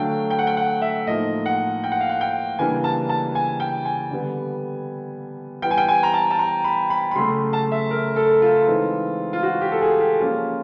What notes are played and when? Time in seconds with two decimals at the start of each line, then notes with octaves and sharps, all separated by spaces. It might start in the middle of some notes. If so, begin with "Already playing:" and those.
Already playing: D3 F#3 A3 D4 F5 G5
0.30 G5
0.39 F#5
0.47 G5
0.57 F#5
0.82 E5
1.07 A2 F3 A#3 D#4 D#5
1.46 F#5
1.84 G5
1.92 F#5
2.00 F5
2.09 F#5
2.21 G5
2.59 C#3 E3 G3 A#3 D4 G#5
2.84 A5
3.09 A5
3.35 G#5
3.60 G5
3.85 G#5
4.11 D3 G3 B3
5.62 E3 G3 B3 G5
5.71 G#5
5.77 G5
5.88 G#5
6.03 A#5
6.14 A5
6.31 A5
6.39 A#5
6.64 B5
6.90 B5
7.11 B5
7.16 C#3 F#3 A3 C6
7.53 A5
7.72 E5
7.91 A#4
8.16 A4
8.42 F4
8.67 E3 G#3 C4 D#4
9.33 F4
9.43 F#4
9.61 G4
9.72 A4
9.81 G#4
10.00 G4
10.19 F3 A#3 C#4 F4